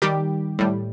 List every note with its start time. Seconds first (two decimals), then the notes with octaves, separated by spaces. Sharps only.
0.02 D#3 G3 G4
0.59 A2 G3